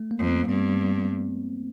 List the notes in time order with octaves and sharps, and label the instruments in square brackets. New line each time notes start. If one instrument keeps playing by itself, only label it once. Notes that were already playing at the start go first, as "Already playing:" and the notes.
Already playing: [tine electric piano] A3
A#3
[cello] F2
[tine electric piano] B3
[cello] G2 [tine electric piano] C4